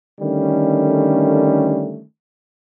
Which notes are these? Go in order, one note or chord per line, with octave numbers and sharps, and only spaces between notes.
D3 D#3 G3 A3 C#4